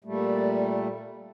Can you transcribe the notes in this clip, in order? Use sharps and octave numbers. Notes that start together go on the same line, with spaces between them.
A#2 G3 A3